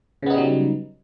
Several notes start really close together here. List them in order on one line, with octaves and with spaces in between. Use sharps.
C#3 B3 D#4 G3 F#3